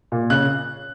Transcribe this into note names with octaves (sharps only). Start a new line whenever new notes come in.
A#2
C#3 F#6